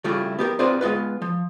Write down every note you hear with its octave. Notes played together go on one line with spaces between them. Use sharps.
C#3 G3 A3 E4 F4 G4
B3 G4 A4 A#4
C4 F4 G#4 B4 C5 D5
G#3 B3 F4 B4
F3